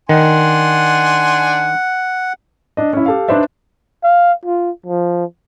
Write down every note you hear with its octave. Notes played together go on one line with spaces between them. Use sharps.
D#3 D4 F#5 G#5 C6
D4 D#5
C#4 E4
G4 A4 F5
D4 D#4 B4 C5 D5 E5
F5
F4
F3